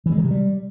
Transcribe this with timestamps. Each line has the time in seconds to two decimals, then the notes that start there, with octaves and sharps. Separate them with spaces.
0.06 E3
0.12 G#3
0.18 D#3
0.24 C3
0.31 G3